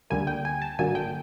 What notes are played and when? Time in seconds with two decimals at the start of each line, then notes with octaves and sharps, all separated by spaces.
0.10 D2 D3 G3 A#3 G#5
0.27 G5
0.45 G#5
0.62 A5
0.79 G#1 G2 D3 F#3 A#3 G#5
0.95 G5